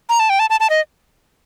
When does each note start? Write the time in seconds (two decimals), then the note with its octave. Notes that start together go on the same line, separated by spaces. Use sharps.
0.09 A#5
0.20 A5
0.30 G5
0.39 A5
0.50 A5
0.60 A5
0.70 D#5